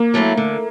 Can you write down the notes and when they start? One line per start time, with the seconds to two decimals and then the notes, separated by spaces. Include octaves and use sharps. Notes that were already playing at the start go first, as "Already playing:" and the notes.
Already playing: A#3
0.14 F#3 A3 C4 E4
0.37 D3